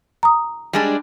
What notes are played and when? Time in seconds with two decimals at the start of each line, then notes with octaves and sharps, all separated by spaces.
0.23 A#5 D#6
0.73 G3 G#3 D4